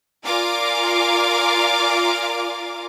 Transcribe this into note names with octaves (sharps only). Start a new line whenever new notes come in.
F4 A#4 D5 F5 G#5 D6